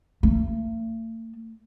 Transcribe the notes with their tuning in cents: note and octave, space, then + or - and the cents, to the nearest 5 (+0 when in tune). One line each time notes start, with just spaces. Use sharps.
A3 +45